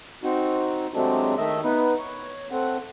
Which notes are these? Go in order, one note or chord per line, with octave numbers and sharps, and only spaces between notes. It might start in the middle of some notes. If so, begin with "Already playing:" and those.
C4 D#4 F#4
C3 F#3 G#3 A3 C4 D4
D#3 A3 D#5 E5
B3 D#4 B4
C#5
A3 C4 F#5